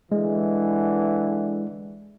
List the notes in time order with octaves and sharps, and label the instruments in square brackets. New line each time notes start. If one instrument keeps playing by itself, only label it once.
[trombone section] D3 E3 [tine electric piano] G#3